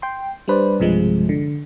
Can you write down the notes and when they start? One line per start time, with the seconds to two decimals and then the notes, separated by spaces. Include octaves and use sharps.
0.02 G5 C6
0.48 G3 D4 B4 C5 D5
0.79 B1 G2 C3 F3 G#3
1.29 D3